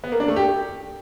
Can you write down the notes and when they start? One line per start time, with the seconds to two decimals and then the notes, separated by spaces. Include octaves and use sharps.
0.04 B3
0.12 A#3
0.20 D4
0.28 A3
0.36 G4